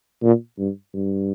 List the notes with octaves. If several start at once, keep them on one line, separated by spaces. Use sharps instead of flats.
A#2
G2
G2